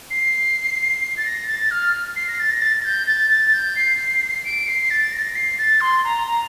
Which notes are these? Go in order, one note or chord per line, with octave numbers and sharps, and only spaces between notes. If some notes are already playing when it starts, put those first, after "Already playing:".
C7
A6
A#6
A6
F6
C7
A#6
A6
A#6
A6
G6
A6
A6
G6
C7
D7
C7
A6
A#6
C7
A6
C6
A#5
A#5